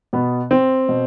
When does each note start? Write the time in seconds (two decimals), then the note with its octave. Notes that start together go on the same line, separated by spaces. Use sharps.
0.13 B2 B3
0.51 C4
0.89 B2